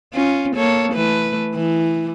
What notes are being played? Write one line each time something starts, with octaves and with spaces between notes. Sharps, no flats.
C#4 F4
A#3 A4 C#5
E3 A3 B4
E3